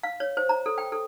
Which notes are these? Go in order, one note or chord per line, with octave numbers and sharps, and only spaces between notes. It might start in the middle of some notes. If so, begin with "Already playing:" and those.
F5
C#5
C5
A#5
A4
G5
A4